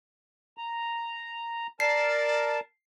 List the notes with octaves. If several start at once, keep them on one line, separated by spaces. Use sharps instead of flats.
A#5
A#4 D5 A5 C7